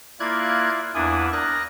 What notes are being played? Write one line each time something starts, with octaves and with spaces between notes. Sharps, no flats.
A#3 E4 F4 D5 F#6 G#6
E2 A#3 D4 E4 G#5 D#6
A#4 D5 D#6 F#6 A#6